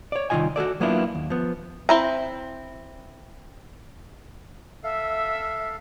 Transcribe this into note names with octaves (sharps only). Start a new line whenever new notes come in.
C#5 D5
C2 D#3 A3 F4 D#5 G#5
F#4 G#4 A4 D5
F#3 A#3 B3 D4 E4 F4
D#2
F3 B3
C4 E4 A#5
A4 E5 F5